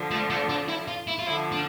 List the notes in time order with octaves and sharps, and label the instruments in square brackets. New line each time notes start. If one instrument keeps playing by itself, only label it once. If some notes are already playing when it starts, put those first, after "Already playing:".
Already playing: [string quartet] D3 F3
[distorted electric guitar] A3
A3
D4
E4
F4
E4
F4
[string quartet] D3 F3 [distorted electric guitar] E4
[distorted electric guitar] D4